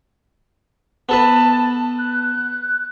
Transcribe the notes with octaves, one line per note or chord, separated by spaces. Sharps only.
B3 A4 B4 A5
F#6